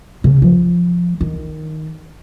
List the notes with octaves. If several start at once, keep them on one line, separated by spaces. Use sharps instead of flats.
C#3
F3
D#3